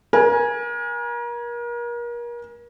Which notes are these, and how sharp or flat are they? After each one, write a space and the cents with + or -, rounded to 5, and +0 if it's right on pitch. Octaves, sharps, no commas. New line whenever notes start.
A#4 +35 G#5 -5